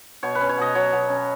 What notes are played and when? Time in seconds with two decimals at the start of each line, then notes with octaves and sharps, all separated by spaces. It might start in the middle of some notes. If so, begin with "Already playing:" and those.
0.23 B2 C#5
0.35 B4
0.41 C#4
0.49 C#5
0.58 B2 D#5
0.75 F#3 C#5
0.93 B2
1.09 C#4